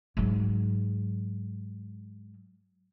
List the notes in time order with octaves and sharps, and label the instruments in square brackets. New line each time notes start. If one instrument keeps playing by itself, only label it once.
[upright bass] G#2 F#3